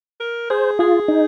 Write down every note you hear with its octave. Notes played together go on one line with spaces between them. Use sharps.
A#4
G#4 C5
F4 G#4
D#4